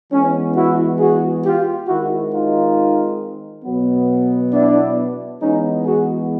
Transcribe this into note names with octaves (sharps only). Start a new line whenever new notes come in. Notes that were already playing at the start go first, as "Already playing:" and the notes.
E3 G#3 B3 C#4
E4 F#4
F#4 G#4
F4 G4
D#3 G#3 C4 E4 F#4
D#4 F4
B2 F#3 B3
D4 E4
E3 G#3 B3 C#4 D#4
F#4 G#4